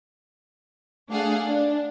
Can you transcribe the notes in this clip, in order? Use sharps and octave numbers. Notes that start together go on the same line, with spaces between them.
A3 D4 G#4 F5 F#5
D4